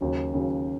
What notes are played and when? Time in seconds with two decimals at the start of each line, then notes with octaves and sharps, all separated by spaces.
0.01 D#2 C#3 F#3
0.33 D#2 C#3 F#3